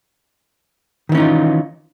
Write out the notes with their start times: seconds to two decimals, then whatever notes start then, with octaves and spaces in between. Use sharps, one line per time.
1.09 D#3
1.12 E3
1.15 C#4
1.17 D#4
1.20 F4